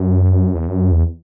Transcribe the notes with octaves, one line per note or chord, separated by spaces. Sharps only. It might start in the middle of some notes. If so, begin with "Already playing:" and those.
Already playing: F#2
E2
F#2
E2